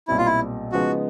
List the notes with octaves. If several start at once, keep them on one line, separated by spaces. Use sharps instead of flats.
B1 A#2 G3 C4 E4
F4
E4
C#3 F3 G#3 B3 D#4 F#4